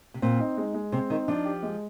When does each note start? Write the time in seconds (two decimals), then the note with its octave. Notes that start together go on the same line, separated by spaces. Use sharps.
0.14 C3
0.22 A#2 C4
0.40 D#4
0.58 G#3
0.74 G#3
0.92 C3 C4
1.10 D#3 D#4
1.28 F3 D4
1.45 G4
1.63 G#3